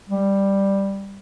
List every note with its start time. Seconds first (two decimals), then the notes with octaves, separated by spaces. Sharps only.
0.09 G3